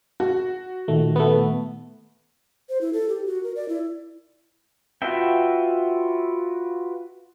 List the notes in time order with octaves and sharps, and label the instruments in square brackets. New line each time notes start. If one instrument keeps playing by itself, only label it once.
[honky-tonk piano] F#4
[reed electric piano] A#2 D#3 [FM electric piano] A3
[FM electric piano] A3 B3
[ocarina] C5
E4
A4
G4
F#4
A#4
D5
E4
[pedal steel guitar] F4 F#4 B4 E5 G5